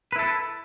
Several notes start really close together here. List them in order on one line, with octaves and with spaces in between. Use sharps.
B4 E4 A4